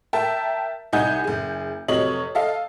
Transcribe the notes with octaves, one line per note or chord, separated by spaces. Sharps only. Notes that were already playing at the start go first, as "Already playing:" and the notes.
A#4 E5 G5 A5
C2 D#4 D#5 F#5 G#5 G6
F#1 G#4
F1 C3 F#3 C#5 D#5 F#7
A4 D#5 F5